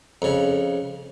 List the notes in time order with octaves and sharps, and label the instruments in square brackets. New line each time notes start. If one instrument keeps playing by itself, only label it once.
[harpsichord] F2 C#3